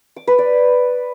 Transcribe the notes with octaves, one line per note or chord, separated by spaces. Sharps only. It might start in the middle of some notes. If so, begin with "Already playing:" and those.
D6
B4
D5